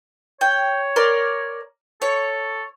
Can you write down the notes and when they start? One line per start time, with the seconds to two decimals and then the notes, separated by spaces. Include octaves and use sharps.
0.41 C#5 G5
0.96 A#4 D5 C6
2.02 A4 C#5